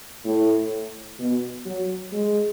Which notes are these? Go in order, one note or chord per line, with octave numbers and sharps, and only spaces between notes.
A2
B2
F#3
G#3